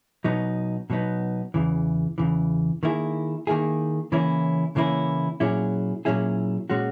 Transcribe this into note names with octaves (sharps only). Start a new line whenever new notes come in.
B2 F#3 B3 D#4
B2 F#3 B3 D#4
E2 C#3 E3
E2 C#3 E3
D#3 A#3 E4 G#4
D#3 A#3 E4 G#4
C#3 E3 A#3 C#4 E4
C#3 E3 A#3 C#4 E4
A#2 F#3 C#4 E4 G#4
A#2 F#3 C#4 E4 G#4
A#2 G#3 C#4 F#4